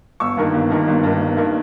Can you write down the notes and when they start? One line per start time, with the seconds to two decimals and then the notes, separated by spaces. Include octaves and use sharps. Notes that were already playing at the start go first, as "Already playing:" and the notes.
0.20 G1 C#6 E6
0.37 G2 D#3 A#3
0.54 G1
0.70 G2 D#3 A#3
0.88 G1
1.03 G2 D#3 A#3
1.20 G1
1.37 G2 D#3 A#3